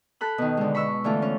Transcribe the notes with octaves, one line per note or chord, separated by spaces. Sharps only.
A4 B5 F#6
B2 D#3
D3 G#3
B5 C#6 E6
D3 E3 A3 F4
C#4